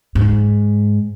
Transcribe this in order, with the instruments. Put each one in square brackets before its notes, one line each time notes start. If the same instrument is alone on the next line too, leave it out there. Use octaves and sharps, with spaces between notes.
[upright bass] G#2